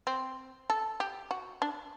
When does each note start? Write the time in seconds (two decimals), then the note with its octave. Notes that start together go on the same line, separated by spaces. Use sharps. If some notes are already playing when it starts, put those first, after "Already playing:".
0.07 C4
0.70 A4
1.00 G4
1.31 F#4
1.62 D4